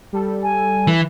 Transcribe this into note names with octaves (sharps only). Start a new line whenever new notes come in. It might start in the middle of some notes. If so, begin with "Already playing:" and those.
G3 A4
G#5
E3